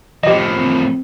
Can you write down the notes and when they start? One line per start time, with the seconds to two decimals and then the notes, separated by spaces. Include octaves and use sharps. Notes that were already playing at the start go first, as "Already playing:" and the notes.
0.23 A2 F3 G4 D#5
0.57 C4